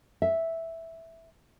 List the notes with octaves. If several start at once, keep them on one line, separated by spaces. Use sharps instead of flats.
E5